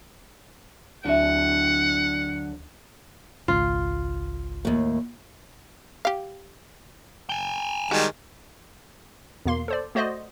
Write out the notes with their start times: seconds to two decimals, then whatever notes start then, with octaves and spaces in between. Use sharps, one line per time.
1.04 D2 D3 F#3 E5 F#5
3.48 G#1 C#2 F4
4.65 D#2 A2
6.05 G4 F5
7.29 G5 G#5
7.91 D#3 G3 G#3 F#4
9.45 E2 B2 A#3 C6
9.68 A4 C5 D5
9.95 A3 F#4 C5 D5 D#5